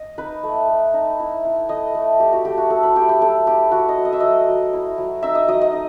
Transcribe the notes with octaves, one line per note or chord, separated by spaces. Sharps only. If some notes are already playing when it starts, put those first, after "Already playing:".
Already playing: D#5
D#4 B4
A3
A3
D#4
E4
E4
A3 D#5
A3
A3 G4
F#4
A3 G4
F#4
E4 A4
B4
A3 G4
G4
F#3 A4
E4 G4
B3 F#4
D#5
F#3
D#5
E5
F#3 D#5
F#3
E4
F#3
D#4 E5
D#5
F#3 D#5
D#5
D#4